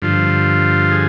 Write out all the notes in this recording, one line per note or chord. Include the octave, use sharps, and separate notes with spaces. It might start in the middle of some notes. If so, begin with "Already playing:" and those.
G2 D3 F3 F4
G#4